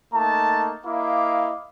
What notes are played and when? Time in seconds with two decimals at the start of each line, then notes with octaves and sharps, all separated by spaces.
0.14 A3 A#3 D#4 A5
0.85 A#3 E4 D#5 F5 D6